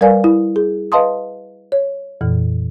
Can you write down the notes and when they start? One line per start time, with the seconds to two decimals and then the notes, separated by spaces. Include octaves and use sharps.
0.01 G3 A#4 B4 D5 F5 G#5
0.24 E4
0.56 G#4
0.92 B4 D#5 F5 A5 C6 D#6
1.72 C#5
2.21 F2 A#2 E3